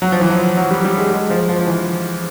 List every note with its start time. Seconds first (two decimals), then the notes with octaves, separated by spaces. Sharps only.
0.02 F#3
0.12 F3
0.21 E3
0.31 F3
0.57 F#3
0.71 G3
0.84 G3
0.98 G#3
1.12 G#3
1.30 F3
1.49 F3
1.61 F3
1.67 E3